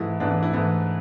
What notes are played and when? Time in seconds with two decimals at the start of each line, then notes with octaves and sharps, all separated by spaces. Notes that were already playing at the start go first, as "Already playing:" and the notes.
Already playing: G#2 E3 A3 E4
0.20 G#2 E3 A3 D4
0.32 D4
0.43 E4
0.53 G#2 E3 A3 E4